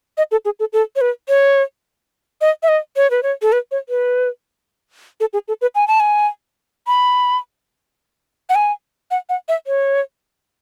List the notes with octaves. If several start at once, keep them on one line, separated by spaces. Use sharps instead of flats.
D#5
A4
G#4
A4
A4
C#5
B4
C#5
D#5
E5
D#5
C#5
B4
C#5
A4
B4
C#5
B4
A4
G#4
A4
B4
G#5
A5
G#5
B5
F#5
G#5
F#5
F#5
E5
C#5